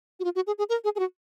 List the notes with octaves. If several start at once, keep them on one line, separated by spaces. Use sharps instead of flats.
F#4
F4
F#4
G#4
G#4
A#4
G#4
G#4
F#4